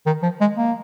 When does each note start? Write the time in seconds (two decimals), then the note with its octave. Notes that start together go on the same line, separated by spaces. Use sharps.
0.06 D#3
0.23 F3
0.41 G#3
0.57 A#3